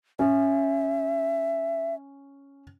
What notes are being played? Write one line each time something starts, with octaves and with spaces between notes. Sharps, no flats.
C#4 E5